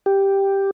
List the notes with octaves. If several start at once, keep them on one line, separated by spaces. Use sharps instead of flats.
G4